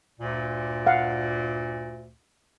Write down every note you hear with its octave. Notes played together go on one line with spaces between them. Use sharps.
D2 G2 A#2
F5 F#5